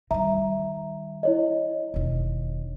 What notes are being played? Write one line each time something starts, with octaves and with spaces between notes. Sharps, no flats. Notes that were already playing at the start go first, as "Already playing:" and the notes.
D#3 G3 E5 A#5
E4 C#5 D#5
E1 D#3